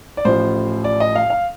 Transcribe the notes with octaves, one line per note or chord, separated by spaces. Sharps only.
D5
A1 A2 F3 C5
D5
D#5
F5
F5